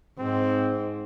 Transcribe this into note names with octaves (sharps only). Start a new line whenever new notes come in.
G#2 C4